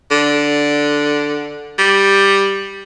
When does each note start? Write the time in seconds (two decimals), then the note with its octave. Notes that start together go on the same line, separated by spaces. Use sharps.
0.11 D3
1.78 G3